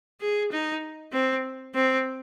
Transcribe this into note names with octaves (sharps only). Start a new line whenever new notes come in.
G#4
D#4
C4
C4